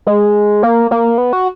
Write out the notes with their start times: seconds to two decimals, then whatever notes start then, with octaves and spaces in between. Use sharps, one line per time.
0.07 G#3
0.63 A#3
0.91 A#3
1.18 B3
1.33 F#4